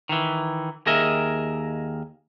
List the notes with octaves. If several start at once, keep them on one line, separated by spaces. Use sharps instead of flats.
D#3 E3
D#2 G#4 A#4 D#5 E5